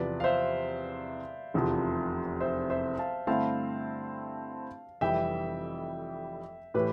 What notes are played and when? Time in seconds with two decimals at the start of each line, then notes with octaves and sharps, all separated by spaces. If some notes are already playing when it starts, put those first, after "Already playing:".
Already playing: E2 C3 F3 B4 D5
0.20 F5
0.24 C5 E5
1.54 F1 E2 C3 F3
2.40 C5 E5
2.70 C5 E5
2.99 F5 A5
3.27 G2 D3 A3 C4 E4 F5 A5
5.01 F1 F2 E3 G3 E5 G5
6.74 A2 E3 G4 B4